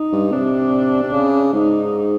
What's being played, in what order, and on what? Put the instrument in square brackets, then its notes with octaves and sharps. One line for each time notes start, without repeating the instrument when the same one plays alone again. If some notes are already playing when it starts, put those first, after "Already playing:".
Already playing: [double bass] D#4
[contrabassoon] G2
[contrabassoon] C3 [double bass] D4
[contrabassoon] C3
C#3
[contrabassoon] G#2 [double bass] D#4